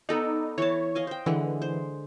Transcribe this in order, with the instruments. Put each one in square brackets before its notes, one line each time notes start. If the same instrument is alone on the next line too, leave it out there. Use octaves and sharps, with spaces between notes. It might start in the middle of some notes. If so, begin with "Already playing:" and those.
[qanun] B3 A4 D5 [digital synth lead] D#4
[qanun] E3 A5 [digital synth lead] C#5
[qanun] D#5 F5 G#5
C5 G5
[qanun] D3 G#3 [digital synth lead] E3
[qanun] C5